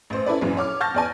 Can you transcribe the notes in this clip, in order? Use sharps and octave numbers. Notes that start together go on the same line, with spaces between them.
A1 C5
C#4 E4 A4 B4 D5
A#1 F#2 E3
C#5 D6 F6
A5 C#6 F6 G6 A6 A#6
E2 D5 G#5